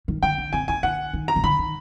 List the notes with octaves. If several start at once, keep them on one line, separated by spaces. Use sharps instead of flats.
D#3
D3 G5
D3
C3 G#5
C#3 G#5
D3 F#5
D#3
A#5
C#3
D3 B5
D#3